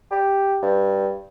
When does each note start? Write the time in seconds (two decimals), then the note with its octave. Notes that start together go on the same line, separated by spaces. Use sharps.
0.11 G4
0.62 G2